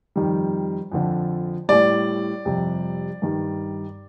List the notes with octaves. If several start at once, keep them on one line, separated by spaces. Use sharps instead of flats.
F2 D#3 G3
F2 D3 F3
A2 G3 D5
F2 C3 G3
G2 D#3 G3